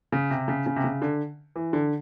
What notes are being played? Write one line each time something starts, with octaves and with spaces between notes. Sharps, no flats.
C#3
C3
C#3
C#3
C3
C#3
D3
E3
D3